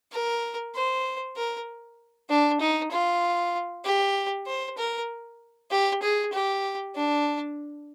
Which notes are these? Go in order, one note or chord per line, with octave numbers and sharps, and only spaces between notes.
A#4
C5
A#4
D4
D#4
F4
G4
C5
A#4
G4
G#4
G4
D4